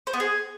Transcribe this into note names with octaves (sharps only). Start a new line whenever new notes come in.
C5
B3
G#4